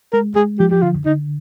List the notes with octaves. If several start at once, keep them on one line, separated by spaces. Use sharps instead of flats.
G#3 A#4
G#3 G#4
F3 G4
G4
D3 F4
D3 D#4